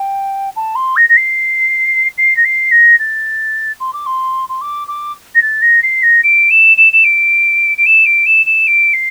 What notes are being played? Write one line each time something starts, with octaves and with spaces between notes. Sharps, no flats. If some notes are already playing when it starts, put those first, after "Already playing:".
Already playing: G5
A5
C6
A#6
A#6
C7
C7
A#6
C7
A#6
A6
C6
D6
C6
C6
D6
D6
A#6
A6
A#6
C7
A#6
D7
E7
E7
E7
D7
D7
E7
D7
E7
E7
D7
C7